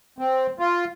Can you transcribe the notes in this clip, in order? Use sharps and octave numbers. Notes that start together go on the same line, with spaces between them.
C4
F4